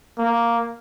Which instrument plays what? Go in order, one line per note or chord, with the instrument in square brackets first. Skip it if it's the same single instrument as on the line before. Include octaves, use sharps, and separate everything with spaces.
[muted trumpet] A#3